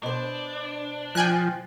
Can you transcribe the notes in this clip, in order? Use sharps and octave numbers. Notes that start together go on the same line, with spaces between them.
B2 D4 C5
F3 G5 G#5 F#6